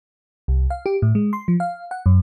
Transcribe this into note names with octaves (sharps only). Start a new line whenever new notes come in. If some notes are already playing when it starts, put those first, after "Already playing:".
C2
F5
G4
A2
G#3
C6
F3
F5
F#5
F#2